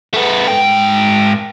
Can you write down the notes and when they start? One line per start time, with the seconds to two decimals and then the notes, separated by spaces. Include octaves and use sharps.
0.14 A3 B3
0.48 G#2 G5